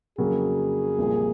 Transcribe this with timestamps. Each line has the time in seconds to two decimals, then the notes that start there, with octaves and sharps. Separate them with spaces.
0.18 F2 C#3 F#3 A#3 G#4
0.98 C2 A#2 F3 A#3